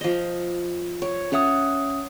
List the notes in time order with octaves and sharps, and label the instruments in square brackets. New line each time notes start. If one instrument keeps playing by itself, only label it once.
[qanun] F3 D#5
C#5
[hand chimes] C#4 E5 D#6 [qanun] A4 C#5 F#5